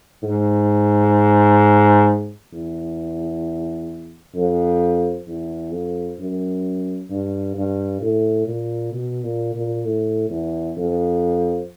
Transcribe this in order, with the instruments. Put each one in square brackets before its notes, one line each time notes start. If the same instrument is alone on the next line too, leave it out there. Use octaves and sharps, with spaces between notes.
[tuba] G#2
E2
F2
E2
F2
F#2
G2
G2
A2
A#2
B2
A#2
A#2
A2
E2
F2